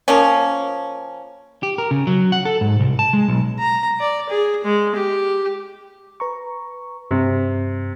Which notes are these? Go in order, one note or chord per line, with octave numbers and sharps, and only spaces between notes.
F3 A#3 C#4
G4
A#4
C#3
F#3
F#5
A4
G#2
C2
A5
G#3
B1
A#5
D5
G#4
G#3
G4
B4 A#5 C#6
G2 C3